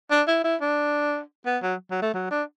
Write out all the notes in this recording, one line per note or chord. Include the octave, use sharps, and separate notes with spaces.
D4
E4
E4
D4
B3
F#3
F#3
A3
F#3
D4